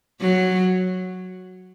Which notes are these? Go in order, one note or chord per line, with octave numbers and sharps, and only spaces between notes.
F#3